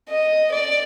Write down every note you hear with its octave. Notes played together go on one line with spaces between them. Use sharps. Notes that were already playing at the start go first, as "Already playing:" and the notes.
D#5
D5